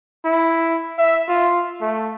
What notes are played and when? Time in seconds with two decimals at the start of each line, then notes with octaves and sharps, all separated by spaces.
0.25 E4
0.99 E5
1.28 F4
1.81 A3